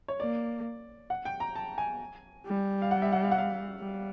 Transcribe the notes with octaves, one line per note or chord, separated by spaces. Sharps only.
C#5
A#3 D5
F#5
G5
A#5
A5
G#5
G3
F5
F#5
E5
F#5
F5
F#5
F5
G3